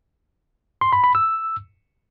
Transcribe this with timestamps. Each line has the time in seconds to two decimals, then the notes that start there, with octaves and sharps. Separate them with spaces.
0.81 C6
0.93 B5
1.04 B5
1.15 E6